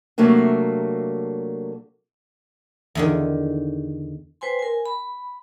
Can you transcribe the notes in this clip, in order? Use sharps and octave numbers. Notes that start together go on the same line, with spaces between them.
C3 F#3 A3 A#3 D4
E2 D3 D#3
B4 C5 G5 G#5 C6
A#4 G#5
B5